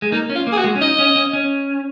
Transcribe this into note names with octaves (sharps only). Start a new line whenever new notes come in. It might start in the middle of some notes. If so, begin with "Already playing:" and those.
G#3
A#3 D#4
C#4
F4
A#3
G#4
F#4
G#3
C#4
D#4 D#5
C#4
C#4
C#4